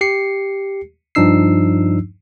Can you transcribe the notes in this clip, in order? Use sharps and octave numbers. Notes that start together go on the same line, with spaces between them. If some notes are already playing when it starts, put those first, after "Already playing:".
G4 C7 C#7
G2 F3 D4 D#4 E6 C7